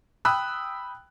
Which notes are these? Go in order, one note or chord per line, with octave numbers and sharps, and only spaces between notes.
G5 B5 D#6 E6 F#6